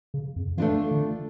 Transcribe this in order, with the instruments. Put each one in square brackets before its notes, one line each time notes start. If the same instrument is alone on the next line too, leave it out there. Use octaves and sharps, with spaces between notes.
[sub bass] C#3
F2
[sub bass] E3 [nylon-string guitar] A3 D4 F4
[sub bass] D3